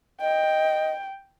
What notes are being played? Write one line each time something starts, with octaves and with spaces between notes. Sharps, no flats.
D#5 G5